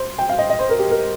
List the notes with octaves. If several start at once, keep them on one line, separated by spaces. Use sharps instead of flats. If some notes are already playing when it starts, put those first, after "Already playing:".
Already playing: C5
G5
F5
D#5
D#5
C5
A#4
G4
A#4